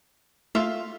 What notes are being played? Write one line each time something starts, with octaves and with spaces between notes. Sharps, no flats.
A3 F4 A4 E5 F5